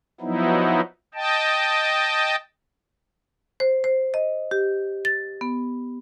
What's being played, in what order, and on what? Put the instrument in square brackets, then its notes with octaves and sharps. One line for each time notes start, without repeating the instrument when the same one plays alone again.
[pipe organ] F3 F#3 B3 D#4 E4
D#5 G5 A5
[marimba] C5
C5
D#5
G4
A6
B3